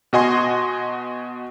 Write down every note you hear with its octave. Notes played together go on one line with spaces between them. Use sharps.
B2 F#4 D#5 G#5 C6